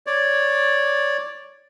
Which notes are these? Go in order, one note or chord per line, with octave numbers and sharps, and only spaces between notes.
C#5 D5